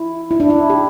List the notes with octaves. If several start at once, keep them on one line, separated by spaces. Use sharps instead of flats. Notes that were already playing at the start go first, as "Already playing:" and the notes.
Already playing: E4
E4
D4
E4
G4